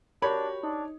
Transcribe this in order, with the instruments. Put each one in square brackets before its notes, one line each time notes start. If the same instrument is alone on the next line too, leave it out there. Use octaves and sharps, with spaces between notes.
[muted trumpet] D4 [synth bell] F#4 G4 A#4 [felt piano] C#5 [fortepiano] B5
[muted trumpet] D4 [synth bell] D#4